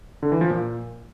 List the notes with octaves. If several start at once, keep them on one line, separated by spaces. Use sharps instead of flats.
D3
E3
F3
A#2